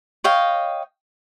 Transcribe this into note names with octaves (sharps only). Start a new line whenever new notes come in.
C#5 D#5 F5 G5